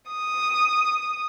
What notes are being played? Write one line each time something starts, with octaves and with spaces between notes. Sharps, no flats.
D#6